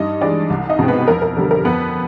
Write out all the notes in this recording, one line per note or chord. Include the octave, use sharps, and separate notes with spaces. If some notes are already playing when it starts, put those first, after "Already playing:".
Already playing: G2 D#4 D#5
E3 G#3 D4 D5
C2
D#4 D#5
B2 G#3 C4
B3 B4
F2 A#4
A#4
D3 G3 A4
A#4
F2 B3 B4